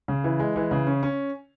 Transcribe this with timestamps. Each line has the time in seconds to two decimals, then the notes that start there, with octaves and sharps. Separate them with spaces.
0.08 C#3
0.24 E3
0.40 G#3
0.56 E3
0.71 C#3
0.87 C#4
1.03 C#4